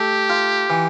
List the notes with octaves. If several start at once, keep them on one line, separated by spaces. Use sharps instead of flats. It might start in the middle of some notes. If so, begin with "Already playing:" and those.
Already playing: A3 G4
F4
E3